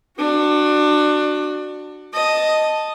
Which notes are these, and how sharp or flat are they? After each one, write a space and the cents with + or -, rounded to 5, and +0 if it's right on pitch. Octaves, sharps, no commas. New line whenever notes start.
D4 +25 F#4 +0
D#5 +0 A5 +0